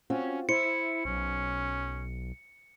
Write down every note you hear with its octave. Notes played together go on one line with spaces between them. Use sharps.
C4 C#4 F4 F#4
E4 C5 C#7
B1 C#4